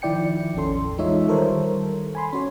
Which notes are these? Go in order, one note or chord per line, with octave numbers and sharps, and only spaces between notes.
D#3 F3 E4 D5 G5 C#7
A1 E2 C#4 A4 C6
E3 G#3 D#4 F4 C#5 E5
D#3 G3 A4 A#4 C5 C#5
G#5 B5 C6
C#4 F#4 C#5